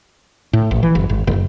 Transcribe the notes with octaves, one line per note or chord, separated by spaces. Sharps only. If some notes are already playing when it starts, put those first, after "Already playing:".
A2
A1
E3
F#1
G#1
F#1